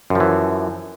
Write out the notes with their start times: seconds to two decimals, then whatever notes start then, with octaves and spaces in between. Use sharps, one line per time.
0.10 F#2
0.15 F3
0.20 E3